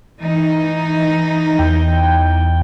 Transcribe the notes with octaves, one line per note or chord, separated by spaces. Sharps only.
E3 D#4
E2 G5